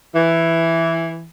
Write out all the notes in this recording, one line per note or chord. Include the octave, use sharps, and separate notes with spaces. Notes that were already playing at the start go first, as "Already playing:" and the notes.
E3